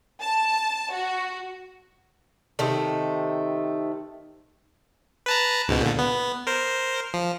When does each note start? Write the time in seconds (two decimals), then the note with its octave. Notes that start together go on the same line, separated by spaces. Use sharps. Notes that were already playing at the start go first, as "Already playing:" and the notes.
0.20 A5
0.92 F#4
2.59 C3 D#3 A3
5.26 B4 A5 A#5
5.68 C#2 G#2 B2
5.81 A#2 D3
5.99 B3
6.47 A#4 C5
7.14 F3